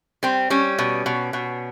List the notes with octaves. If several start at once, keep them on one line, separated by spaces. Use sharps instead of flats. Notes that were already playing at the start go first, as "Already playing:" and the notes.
G3 C4
G3 C#4
B2
B2
B2